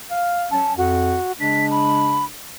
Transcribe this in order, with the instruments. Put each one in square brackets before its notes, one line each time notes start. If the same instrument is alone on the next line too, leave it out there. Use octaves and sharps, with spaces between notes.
[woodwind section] F5
[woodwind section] F#3 C#4 [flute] A5
[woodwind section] F2 [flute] F#4
[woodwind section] C#3 G#3 D4 [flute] B6
[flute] B5